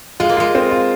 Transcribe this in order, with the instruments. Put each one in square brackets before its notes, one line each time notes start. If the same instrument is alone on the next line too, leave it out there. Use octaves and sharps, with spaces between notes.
[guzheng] G#3 [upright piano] F4
[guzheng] A#3
[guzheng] G#3 [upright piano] F4
[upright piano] C4
F4